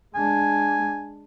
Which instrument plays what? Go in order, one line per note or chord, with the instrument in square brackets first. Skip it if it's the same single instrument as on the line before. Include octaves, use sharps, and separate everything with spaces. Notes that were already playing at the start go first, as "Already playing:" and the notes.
[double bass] G#3 D4 [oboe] G#5